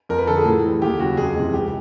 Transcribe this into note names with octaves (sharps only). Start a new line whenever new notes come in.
F2 A#4
B4
D3 F3 A4
G#4
A2
E3 G3
D#2 G4
C#3 F#3 F#4
F2 G#4
C3 E3 G#3
C#2 G4